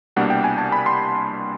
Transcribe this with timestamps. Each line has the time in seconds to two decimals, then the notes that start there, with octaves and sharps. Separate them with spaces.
0.16 C2 B2 G3 A#3 D4 F#5
0.30 G5
0.44 G#5
0.58 A5
0.72 B5
0.86 C6